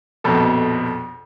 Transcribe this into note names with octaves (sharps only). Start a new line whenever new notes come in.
A#1 F2 B2 A4